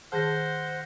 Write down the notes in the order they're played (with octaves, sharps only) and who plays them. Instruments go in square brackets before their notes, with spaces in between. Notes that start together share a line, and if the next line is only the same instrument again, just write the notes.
[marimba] D#3 G#4 A5 [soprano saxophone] C5 [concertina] F#5 [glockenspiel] F6 G6 A#6